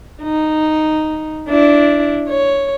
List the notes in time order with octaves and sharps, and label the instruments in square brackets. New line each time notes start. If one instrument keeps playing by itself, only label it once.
[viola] D#4
D4 E4
C#5